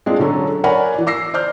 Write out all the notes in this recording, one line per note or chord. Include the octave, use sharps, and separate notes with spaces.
G#3 C4 D4 F4 G#4
D3 F#3 C#4 A4
A#4 C#5 D5 F#5 G#5 B5
E3 D5
D6 E6 A#6 C7
C5 D5 D6 F6 G6